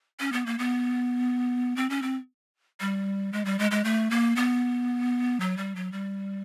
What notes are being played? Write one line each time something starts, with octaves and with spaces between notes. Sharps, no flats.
C#4
B3
A#3
B3
C4
C#4
C4
G3
G#3
G3
G#3
G#3
A3
A#3
B3
F#3
G3
F#3
G3